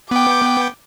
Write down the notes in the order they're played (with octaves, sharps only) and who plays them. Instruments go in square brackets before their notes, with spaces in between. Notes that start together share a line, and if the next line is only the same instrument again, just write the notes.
[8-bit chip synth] B3 G5 [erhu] D6